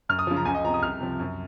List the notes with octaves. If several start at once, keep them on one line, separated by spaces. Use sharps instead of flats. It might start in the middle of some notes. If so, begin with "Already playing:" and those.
F#2 F6
D#6
C#3 F3
A#5
C#2 G#5
D#5
C3 F3 A#5
D#6
C2 F6
C3 F3
F#2